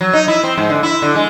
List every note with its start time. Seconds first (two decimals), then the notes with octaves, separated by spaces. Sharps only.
0.01 F#3
0.13 D#4
0.28 E4
0.44 C4
0.58 G#2
0.70 D3
0.83 E4
1.02 D3
1.15 G#3